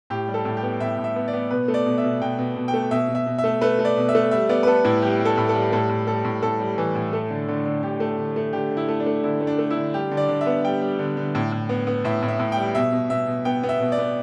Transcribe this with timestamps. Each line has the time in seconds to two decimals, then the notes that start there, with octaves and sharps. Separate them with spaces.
0.10 A2 G4
0.28 G3
0.34 A4
0.45 A2
0.57 G4
0.63 B3
0.80 A2 E5
0.98 A2
1.04 E5
1.16 B3
1.28 D5
1.33 B3
1.51 B2 B4
1.68 A3
1.74 D5
1.86 B2
1.98 E5
2.04 B2
2.21 B2 G5
2.39 B2
2.56 B2
2.68 G5
2.74 A3
2.91 B2 E5
3.08 B2
3.15 E5
3.26 B2
3.38 E5
3.44 A3
3.61 A3 B4
3.79 A3
3.85 D5
3.97 B2
4.09 E5
4.15 A3
4.31 G3 E5
4.49 B3 D5
4.63 B4
4.67 B3 A4
4.84 A2 E4
5.02 G3 G4
5.19 G3
5.25 A4
5.37 A2
5.49 A4
5.54 G3
5.72 A2 A4
5.89 A2
6.07 G3 A4
6.25 A2
6.42 A2 A4
6.60 G3
6.78 E3
6.95 A2
7.13 A3
7.30 D3
7.48 D3
7.65 D3
7.83 D3 G4
8.00 A3
8.18 D3
8.36 A3
8.53 D3 G4
8.71 D3
8.77 E4
8.88 A3
9.00 D4
9.06 A3
9.24 D3 E4
9.41 A3
9.47 D4
9.59 A3
9.70 E4
9.76 D3
9.94 G3 G4
10.11 D3
10.17 D5
10.29 D3
10.41 E5
10.46 B3
10.65 G3 G5
10.81 G3
10.99 D3
11.17 D3
11.35 A2
11.52 A2
11.69 B3
11.87 B3
12.05 A2 E5
12.23 A2
12.28 E5
12.40 A2
12.52 G3 G5
12.75 B2 E5
12.92 B2
13.10 B2 E5
13.27 B2
13.45 B3 G5
13.63 B3
13.69 E5
13.80 B2
13.92 D5
13.98 B3